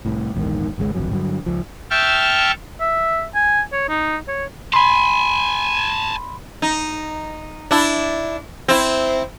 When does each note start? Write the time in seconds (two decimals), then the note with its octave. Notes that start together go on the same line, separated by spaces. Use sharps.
0.05 C2 A2
0.34 A#1 E2 G#2 D#3
0.78 G#1 C#2 F3 G#3
0.95 D1 G#1 F2 F#3
1.11 G2 D3 F3 F#3
1.46 C#2 F3
1.90 E5 G5 A5 C#6 F6
2.80 E5
3.35 G#5
3.73 C#5
3.89 D#4
4.28 C#5
4.74 G#5 A5 B5 C6
6.62 D#4
7.71 D4 E4
8.68 C4 E4